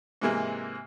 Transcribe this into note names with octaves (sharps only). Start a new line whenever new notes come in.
G#2 C3 E3 G#3 A#3